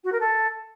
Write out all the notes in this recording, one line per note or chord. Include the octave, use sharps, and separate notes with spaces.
F#4
A#4
A4